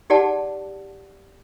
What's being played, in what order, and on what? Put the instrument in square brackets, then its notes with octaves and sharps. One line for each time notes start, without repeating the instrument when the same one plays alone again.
[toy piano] D#4 G4 G#4 D5 F#5 A5